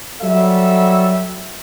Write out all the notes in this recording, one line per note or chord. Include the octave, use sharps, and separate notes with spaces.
F#3 G3 A4 E5